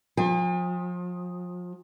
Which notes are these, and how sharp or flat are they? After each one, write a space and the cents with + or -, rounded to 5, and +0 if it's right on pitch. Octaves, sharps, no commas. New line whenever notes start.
F3 +35 G#5 -45